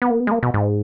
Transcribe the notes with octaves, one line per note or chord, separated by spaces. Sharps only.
B3
A#3
B3
G#3
A#3
B2
G#2